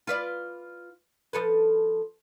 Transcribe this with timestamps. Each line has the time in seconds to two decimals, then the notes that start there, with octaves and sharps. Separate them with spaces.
0.07 F4 B4 D5
1.33 F3 A4 B4